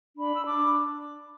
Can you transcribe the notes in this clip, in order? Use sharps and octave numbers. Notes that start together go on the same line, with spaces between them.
D4 B5
E6
D4 D6